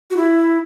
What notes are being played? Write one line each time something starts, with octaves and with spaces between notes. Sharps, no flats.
F#4
E4